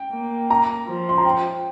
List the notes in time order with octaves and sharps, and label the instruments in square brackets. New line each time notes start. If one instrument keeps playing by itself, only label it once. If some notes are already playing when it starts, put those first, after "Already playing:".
Already playing: [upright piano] G5
[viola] A#3
[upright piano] A#5
[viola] F3
[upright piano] C6
A#5
G5